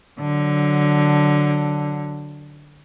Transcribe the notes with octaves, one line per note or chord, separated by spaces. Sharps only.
D3 F#3